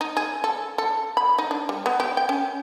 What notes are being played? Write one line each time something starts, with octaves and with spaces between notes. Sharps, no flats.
D#4
G#4
A4
A4
B5
D#4
D4
G3
B3
G4
G5
C#4